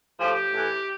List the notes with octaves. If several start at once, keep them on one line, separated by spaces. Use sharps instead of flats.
A2 F3 G4
A2 E3